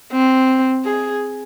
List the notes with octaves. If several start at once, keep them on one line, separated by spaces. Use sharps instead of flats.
C4
G#4